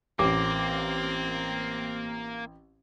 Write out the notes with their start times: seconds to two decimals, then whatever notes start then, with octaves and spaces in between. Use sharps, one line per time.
0.19 A1 A#3 C4 D6